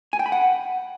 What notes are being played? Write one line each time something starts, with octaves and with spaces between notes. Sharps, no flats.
G#5
G5
B5
F#5